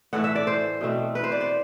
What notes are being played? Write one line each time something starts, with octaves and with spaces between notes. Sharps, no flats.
A2 E3 A3 F#5
E5
D5
C5
B2 A3 C4
B4
C5
D5
C5